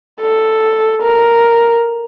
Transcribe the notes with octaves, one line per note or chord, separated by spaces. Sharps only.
A4
A#4